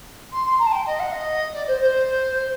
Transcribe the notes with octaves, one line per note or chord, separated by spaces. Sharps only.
C6
C6
A#5
A5
G5
D#5
F#5
D#5
D5
C5
C5